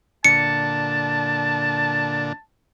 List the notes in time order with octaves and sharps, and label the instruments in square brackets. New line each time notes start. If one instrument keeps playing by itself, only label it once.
[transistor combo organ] A#2 D3 D4 [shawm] A5 [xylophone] C#7